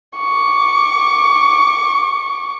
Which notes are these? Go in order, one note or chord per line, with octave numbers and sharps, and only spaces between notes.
C#6 D6